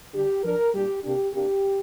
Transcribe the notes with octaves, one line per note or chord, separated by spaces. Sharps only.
D3 G3 D4 G4
F3 D4 A#4
A#2 G3 A#3 D4 G4
C3 A#3 D4 G4
C3 A#3 D4 G4